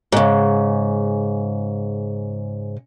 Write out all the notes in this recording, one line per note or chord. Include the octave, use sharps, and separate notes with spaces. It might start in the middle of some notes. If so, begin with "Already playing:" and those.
G#2 C#3